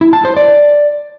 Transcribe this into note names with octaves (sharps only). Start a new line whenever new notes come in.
E4
A5
C5
D5